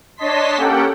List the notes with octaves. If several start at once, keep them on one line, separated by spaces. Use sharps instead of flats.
D4 C#5 D#5 A5 C6 B6
A#3 C#4 G4 A4 F#5 G5